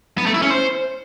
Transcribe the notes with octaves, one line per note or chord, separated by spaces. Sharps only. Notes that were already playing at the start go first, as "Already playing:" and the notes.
B3
A3
E4
C#4
C5